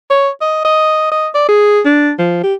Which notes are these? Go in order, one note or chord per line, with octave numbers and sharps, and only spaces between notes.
C#5
D#5
D#5
D#5
D5
G#4
D4
F3
G4